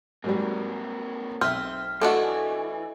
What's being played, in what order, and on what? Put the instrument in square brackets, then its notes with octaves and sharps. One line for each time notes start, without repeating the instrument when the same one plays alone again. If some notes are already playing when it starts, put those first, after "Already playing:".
[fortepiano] G#2 F#3 G3 [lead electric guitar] A#3 C4
[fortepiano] B1 E5 [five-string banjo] C4 [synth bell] F6
[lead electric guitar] E3 [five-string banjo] A3 D4 F#4 [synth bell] A4 D#5